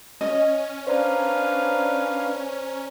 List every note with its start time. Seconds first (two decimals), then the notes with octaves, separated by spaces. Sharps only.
0.21 C#4 D#5
0.87 D4 B4 C5 D5 F5 A#5